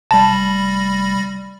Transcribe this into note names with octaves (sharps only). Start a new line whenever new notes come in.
F1 G3 A5 B5 A#6